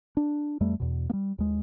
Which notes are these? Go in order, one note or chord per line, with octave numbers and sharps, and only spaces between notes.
D4
F2 G3 A3
E2 B2
G3 A#3
D#2 G#3